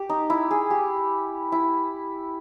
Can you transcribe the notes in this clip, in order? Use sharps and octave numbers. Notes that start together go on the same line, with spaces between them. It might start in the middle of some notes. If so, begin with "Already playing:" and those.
Already playing: G4
D#4
E4
G#4
G4
E4